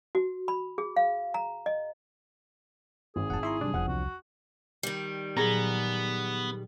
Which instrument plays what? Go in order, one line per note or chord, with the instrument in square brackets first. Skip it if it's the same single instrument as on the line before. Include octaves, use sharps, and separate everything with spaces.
[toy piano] F#4
B5
G#4
F5
A#5
D#5
[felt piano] G#1 [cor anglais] G#4
[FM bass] F1 [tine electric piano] F#5 A5
[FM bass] E4 [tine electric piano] A#5 C6 C#6
[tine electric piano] C3 F#3 G3 [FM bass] D4
[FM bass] E1 [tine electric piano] E2 F3 D4 [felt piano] F#5
[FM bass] C2 [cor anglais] F#4
[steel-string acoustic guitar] D#3 G3
[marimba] A#2 F#3 [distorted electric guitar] B3 [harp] G#4 A#5